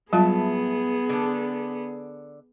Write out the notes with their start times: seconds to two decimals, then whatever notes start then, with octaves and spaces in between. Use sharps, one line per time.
0.13 A2 F#3 G3 B3 F4 G#4 E5 A5
1.09 D3 D4